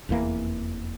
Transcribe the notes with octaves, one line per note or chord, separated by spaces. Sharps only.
F1 E2 E3 A#3